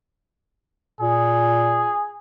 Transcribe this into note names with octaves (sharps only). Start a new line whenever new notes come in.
A#2 G#4